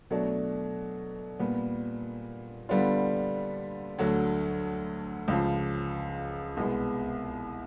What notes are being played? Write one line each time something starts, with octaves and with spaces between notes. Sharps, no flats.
B2 F#3 A3 D4
A#2 G3 B3
D3 G3 B3 D4 F4
D2 D3 F#3
C#2 C#3 F3
C2 B2 G#3 B3